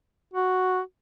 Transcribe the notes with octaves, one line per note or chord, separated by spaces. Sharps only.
F#4